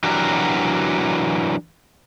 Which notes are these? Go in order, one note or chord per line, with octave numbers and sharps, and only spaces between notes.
E3 F#3 D4 F#4 G4 A#4